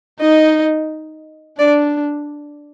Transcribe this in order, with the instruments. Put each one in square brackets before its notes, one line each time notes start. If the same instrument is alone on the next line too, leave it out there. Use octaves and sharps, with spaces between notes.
[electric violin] D#4 [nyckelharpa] D#5
[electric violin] D4 [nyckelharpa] D5